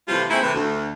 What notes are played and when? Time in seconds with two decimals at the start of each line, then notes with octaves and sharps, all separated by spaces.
0.08 A2 C3 E3 F3 G3 F4
0.30 G#3 A3 C4 D#4 E4
0.42 A2 C3 E3
0.54 D2